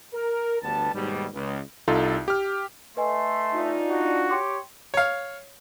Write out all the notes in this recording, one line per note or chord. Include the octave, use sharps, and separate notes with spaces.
A#4
G1 D2 G3 B3 A5
D#2 G#2 B2 G3
C#2
C2 D#4 F4 A4
G4 F6
A3 B4 D#5 E5 G#5 C6
D4 D#4 F4
F#4
G4 C#5 G5 C6 D6 C#7
C#5 F5